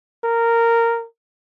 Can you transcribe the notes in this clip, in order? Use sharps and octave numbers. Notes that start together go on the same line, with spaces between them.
A#4